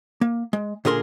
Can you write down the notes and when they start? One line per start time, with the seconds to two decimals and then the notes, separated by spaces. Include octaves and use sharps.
0.21 A#3
0.53 G#3
0.85 A#2 D3 G#4 A#4 C6